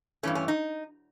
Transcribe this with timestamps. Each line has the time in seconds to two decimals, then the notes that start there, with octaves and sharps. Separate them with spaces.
0.23 G2 E3 A3 C#4
0.35 C#4
0.48 D#4